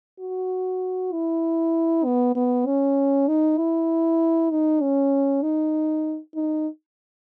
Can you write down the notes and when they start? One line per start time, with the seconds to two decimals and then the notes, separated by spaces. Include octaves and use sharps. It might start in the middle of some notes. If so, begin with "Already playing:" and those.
0.20 F#4
1.13 E4
2.05 B3
2.36 B3
2.66 C#4
3.28 D#4
3.58 E4
4.51 D#4
4.82 C#4
5.42 D#4
6.35 D#4